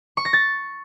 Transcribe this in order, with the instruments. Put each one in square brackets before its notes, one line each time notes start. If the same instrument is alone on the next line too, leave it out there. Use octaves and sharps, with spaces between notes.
[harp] C#6
A#6
A6